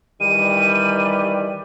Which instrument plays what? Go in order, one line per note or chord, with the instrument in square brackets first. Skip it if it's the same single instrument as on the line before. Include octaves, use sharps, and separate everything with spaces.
[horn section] D#3 E3 G3 [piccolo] D#7